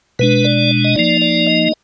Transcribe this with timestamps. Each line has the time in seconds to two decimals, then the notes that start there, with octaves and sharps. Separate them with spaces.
0.19 B2 G#3 D4 B4
0.44 D5
0.84 D#5
0.96 F3 A#3 D#4 D5
1.21 D5
1.47 D#5